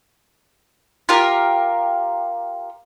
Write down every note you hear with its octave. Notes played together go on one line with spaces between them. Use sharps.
F4 G4 A#4